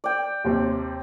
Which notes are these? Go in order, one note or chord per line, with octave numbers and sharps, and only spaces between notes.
D5 G5
D#2 C3